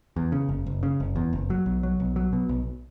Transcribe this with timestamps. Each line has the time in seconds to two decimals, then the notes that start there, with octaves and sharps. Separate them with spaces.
0.16 E2
0.32 C#3
0.49 F#1
0.67 F#1
0.83 C#3
1.00 F#1
1.16 E2
1.33 F#1
1.50 F#3
1.66 B1
1.83 F#3
2.00 B1
2.16 F#3
2.33 B2
2.49 B1